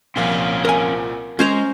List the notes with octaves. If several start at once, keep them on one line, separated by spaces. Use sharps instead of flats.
C2 A#2 F3 C4 C#4 F5
A#4 G#5
G#3 C#4 C5 A#5